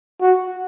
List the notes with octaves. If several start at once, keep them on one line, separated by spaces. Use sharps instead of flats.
F#4